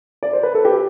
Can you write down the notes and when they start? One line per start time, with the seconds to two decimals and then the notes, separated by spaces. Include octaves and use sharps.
0.23 D5
0.33 C5
0.43 B4
0.55 A4
0.65 G4